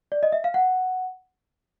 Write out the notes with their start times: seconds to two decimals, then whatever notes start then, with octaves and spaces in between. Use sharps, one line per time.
0.12 D5
0.23 D#5
0.32 E5
0.44 F5
0.54 F#5